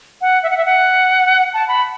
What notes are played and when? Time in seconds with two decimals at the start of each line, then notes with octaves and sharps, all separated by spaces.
0.21 F#5
0.43 E5
0.50 F#5
0.57 E5
0.65 F#5
1.53 A5
1.68 B5